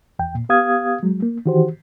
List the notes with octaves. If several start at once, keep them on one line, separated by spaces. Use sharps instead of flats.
E2 G5
A#2
B3 G4 F5 D#6 G#6
F#3 G#3
A#3
D#3 E3 F#4 G4 C5